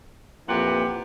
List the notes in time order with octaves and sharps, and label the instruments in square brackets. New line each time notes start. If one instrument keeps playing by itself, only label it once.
[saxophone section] F2 A#2 E3 G4 B4 F#5